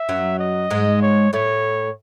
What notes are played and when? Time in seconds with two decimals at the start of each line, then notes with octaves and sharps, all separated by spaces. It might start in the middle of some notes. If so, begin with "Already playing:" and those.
Already playing: E5
0.09 F#2 F#3
0.39 D#5
0.70 G#2 G#3
1.02 C#5
1.33 A2 A3 C#5